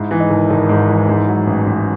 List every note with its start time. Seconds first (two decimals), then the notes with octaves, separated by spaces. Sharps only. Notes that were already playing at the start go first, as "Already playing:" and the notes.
Already playing: G#2 E4
0.11 E3
0.20 D#4
0.30 G#1
0.50 G#1 D#4
0.69 G#2
0.89 E3
1.09 G#2
1.28 F#3
1.47 A1
1.66 A1